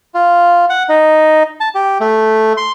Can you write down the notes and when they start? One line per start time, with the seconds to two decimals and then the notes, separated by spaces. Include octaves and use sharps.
0.14 F4
0.70 F#5
0.89 D#4
1.60 A5
1.75 G4
2.00 A3
2.57 C6